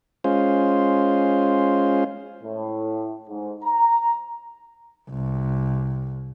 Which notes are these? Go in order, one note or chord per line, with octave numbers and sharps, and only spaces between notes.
G#3 C#4 F4 C5
A2
G#2
A#5
C2